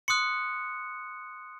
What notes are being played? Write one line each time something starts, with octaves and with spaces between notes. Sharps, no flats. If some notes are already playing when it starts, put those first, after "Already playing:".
C6 D#6 F#6 C#7